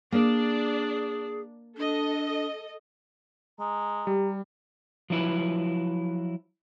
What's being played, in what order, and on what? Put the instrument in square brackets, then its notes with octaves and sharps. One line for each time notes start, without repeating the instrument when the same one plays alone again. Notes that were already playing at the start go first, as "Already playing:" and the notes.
[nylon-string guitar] A#3 [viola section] D4 D5 [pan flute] G#4
[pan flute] D4 [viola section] A4 D#5
[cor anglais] G#3 [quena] A#5
[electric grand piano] G3 [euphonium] G4
[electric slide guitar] F3 F#3 E4 B4